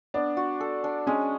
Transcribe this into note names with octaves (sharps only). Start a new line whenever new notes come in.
B3 D4
F#4
A4
D4
G#3 C#4